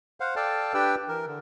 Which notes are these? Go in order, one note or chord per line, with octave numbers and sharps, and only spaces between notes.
C5 F5 F#5
A4 D5 F5 G5 A5
D4 G4 B4 D5 G5 E6
E3 A#4
D3